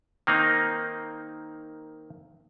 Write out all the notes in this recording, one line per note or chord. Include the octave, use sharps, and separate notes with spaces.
D#3 A#3 C4 D#4